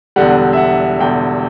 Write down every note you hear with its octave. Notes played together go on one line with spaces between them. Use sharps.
E1 E2 D3 G3 F#5
E5
F#5
E1 E2 D3 G3 G5